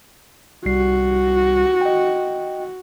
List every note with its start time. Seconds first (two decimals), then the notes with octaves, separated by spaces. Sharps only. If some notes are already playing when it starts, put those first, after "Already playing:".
0.66 C2 G3 F#4 C7
1.81 D#5 G5